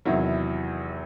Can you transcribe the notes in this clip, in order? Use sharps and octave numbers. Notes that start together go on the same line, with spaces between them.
E2 C3 D#3 F#3 E4